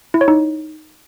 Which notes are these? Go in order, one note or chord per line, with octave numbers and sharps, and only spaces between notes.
E4
C#5
D#4